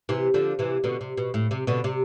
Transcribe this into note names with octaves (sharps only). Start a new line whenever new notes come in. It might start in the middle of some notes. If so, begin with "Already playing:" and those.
C3 E3
D3 F3
C3 E3
B2 D3
C3
B2
A2
C3
B2 D3
C3